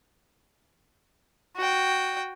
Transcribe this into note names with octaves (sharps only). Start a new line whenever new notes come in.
F#4 G5